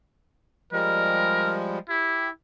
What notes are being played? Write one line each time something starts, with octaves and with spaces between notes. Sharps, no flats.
F3 G3 G#3 A#4
E4 G4